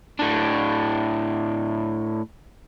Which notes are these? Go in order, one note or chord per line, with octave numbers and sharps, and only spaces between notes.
A2 D4